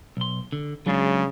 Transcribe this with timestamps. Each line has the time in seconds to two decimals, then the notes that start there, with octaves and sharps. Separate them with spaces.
0.17 B1 C6
0.52 D3
0.86 C#3 F#3 G#3 D4